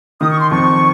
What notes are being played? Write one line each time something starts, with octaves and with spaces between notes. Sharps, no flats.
D#3 D#6
C#6
C6
F2 C#6